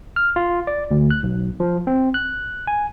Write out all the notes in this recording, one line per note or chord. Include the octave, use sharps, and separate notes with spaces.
F6
F4
D5
D2
F#6
B1
F3
C4
F#6
G#5